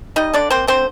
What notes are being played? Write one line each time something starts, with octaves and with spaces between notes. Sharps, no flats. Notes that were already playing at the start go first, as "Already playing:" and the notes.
G3 D#4 D#5
D3 D4 D5
A#3 C4 C5
D3 C4 C5